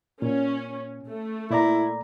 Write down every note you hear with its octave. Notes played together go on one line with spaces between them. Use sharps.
A#2 C#4
A3
A#2 E4 D5 A#5